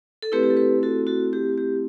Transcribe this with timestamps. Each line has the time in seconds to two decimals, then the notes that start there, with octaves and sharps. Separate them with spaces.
0.22 A4
0.32 A3 C4 E4 G4 B4
0.43 G4
0.50 A4
0.57 G4 B4
0.83 F#4 A4
1.07 F#4 A4
1.33 G4
1.58 G4